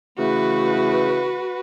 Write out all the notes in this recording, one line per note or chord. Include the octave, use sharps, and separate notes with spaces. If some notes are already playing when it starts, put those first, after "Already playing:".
C#3 E3 A3 F#4 B4